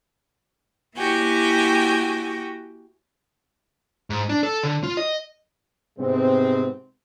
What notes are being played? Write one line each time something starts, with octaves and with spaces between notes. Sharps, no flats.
A#3 E4 F#4 G4 G5 G#5
G#2
D4
A4
D3
F4
D#5
G#2 C3 G#3 B3 C4